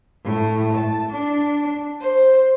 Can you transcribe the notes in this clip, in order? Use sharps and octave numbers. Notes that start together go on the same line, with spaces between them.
A2
A5
D4
C5